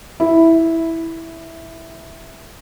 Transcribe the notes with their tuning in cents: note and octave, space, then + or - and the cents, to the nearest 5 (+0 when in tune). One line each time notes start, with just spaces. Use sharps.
E4 -5